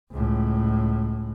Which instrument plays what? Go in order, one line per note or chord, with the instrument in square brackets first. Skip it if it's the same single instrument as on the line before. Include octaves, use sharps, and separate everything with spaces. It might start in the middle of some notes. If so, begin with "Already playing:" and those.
[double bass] C#2 A2